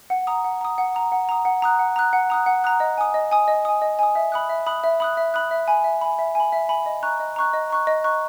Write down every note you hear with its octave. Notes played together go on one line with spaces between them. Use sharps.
F#5
A#5 D#6
F#5
A#5 D#6
F#5
A#5 D#6
F#5
A#5 D#6
F#5
A#5 D#6 F#6
F#5
A#5 D#6 F#6
F#5
A#5 D#6 F#6
F#5
A#5 D#6 F#6
D#5
G#5 D#6
D#5
G#5 D#6
D#5
G#5 D#6
D#5
G#5 D#6
E5
B5 D#6 F#6
E5
B5 D#6 F#6
E5
B5 D#6 F#6
E5
B5 D#6 F#6
E5
G#5 B5
E5
G#5 B5
E5
G#5 B5
E5
G#5 B5
D#5
A#5 C#6 F#6
D#5
A#5 C#6 F#6
D#5
A#5 C#6 F#6
D#5
A#5 C#6 F#6